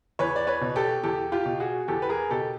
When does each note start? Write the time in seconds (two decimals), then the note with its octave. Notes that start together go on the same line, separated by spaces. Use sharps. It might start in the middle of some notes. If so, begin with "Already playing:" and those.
0.19 E2 B4 C#5
0.36 D5
0.47 B4 C#5
0.61 B2
0.76 G4 A4
1.04 E2 G4 A4
1.32 F4 G4
1.46 B2
1.60 F#4 G#4
1.88 E2 G4 A4
2.02 B4
2.09 G#4 A#4
2.30 B2 G4 A4